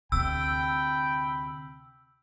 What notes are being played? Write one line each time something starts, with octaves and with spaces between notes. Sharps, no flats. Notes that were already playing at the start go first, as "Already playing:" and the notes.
D2 C3 G5 B5 E6